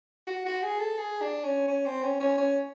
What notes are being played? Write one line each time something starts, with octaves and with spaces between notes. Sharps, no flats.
F#4
F#4
G#4
A4
G#4
D4
C#4
C#4
C4
C#4
C#4
C#4